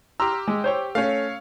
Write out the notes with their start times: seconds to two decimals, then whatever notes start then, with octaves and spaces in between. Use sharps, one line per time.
0.20 G4 A#5 C6 E6 F6
0.48 G#3
0.64 C5 C#5 G5
0.95 A3 C#4 C#5 F5